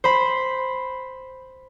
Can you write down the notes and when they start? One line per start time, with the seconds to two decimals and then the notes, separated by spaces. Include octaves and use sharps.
0.04 C5 B5